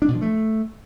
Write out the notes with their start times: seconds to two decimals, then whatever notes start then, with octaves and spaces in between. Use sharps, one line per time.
0.02 D4
0.08 B2
0.15 F3
0.21 A3